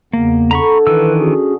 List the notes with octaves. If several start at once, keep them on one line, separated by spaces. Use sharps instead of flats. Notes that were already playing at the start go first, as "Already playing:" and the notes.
E2 C#3 A#3 B3
D3 A#5 B5 C#6
D#3 E3 D#4 B4 E6
C#4 F#4 G#4